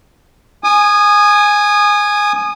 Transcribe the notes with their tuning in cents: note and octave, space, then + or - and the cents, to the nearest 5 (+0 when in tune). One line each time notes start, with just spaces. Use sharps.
G#5 +0 D#6 -25